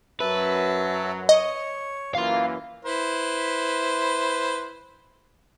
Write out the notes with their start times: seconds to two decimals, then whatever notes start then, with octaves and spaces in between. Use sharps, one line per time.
0.20 F#2 F#3 B4 E5 A5
1.29 C#5 D#5
2.15 F#2 E3 A#3 F5 C6
2.85 E4 B4 C5